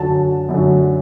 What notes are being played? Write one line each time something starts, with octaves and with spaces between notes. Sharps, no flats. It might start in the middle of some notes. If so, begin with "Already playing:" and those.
Already playing: F#2 D3 F#3 A5
F#2 D3 F#3